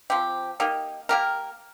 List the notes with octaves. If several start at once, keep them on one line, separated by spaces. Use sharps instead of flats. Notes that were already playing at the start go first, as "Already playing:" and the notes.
F3 C4 G4
A#3 D#4 G4
A#3 G4 A#4